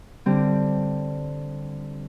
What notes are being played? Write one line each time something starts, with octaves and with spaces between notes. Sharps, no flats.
D3 G3 C4 G4